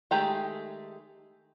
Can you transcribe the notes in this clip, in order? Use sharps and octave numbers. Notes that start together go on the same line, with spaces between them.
D#3 G#3 A3 G4 A#5